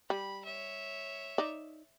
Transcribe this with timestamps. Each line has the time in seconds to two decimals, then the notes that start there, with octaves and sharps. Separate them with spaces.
0.10 G3 B5
0.45 C#5 E5
1.38 D#4 D5